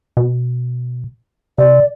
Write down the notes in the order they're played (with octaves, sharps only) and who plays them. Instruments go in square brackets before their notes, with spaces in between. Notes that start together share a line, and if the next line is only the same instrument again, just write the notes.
[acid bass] B2
[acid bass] C3 [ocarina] D5